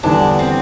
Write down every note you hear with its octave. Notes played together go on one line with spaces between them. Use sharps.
E2 D3 G3 D4
C4